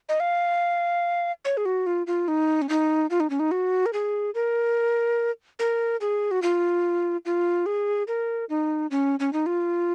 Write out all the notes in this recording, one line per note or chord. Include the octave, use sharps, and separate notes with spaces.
D#5
F5
C#5
G#4
F#4
F4
F4
D#4
C#4
D#4
F4
D#4
C#4
D#4
F#4
A#4
G#4
A#4
A#4
G#4
F#4
F4
F4
G#4
A#4
D#4
C#4
C#4
D#4
F4